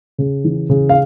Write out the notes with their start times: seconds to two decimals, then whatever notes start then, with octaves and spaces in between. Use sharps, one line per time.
0.18 C#3
0.44 E3
0.70 C#3
0.89 F5